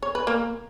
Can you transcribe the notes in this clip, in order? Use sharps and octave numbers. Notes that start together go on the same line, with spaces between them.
C#5
B4
A#3 A#4